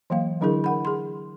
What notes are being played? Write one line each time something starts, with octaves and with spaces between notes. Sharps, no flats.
E3 F#3 A#3 F5
D3 F#3 D4 E4 G#4 A#4
A#4 F#5 B5
G#4 C6